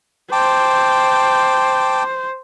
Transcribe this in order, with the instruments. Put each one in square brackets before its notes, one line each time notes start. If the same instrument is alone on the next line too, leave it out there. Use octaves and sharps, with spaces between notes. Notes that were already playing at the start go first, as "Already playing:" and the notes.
[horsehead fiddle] C5 [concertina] G5 A5 D6